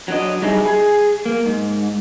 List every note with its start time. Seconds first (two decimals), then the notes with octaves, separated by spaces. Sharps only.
0.08 F#3 D4 D#5
0.42 G3 D#4 E4 G#4
0.65 G#4
1.26 A#3
1.46 G#2